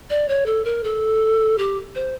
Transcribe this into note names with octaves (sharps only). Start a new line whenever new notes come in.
D5
C#5
A4
A#4
A4
G4
C5